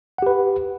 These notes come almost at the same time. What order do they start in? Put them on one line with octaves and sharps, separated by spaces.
F#5 G4 B4